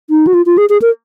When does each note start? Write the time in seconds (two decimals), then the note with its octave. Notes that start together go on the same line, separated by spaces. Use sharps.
0.10 D#4
0.27 F#4
0.34 F4
0.46 F4
0.58 G#4
0.70 G#4
0.82 A#4